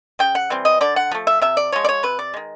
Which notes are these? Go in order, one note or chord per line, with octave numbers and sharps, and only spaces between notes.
C#3 G5
F#5
E3 G3 C4
D#5
D3 D5
F#5
F3 A3
E5
C3 E5
D5
F3 G#3 C#5
D5
C#5
C3 B4
D5
D#3 G#3